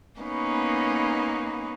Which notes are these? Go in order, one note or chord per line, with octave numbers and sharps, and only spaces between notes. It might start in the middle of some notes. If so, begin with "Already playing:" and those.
A#3 B3 C#4 D#4 B4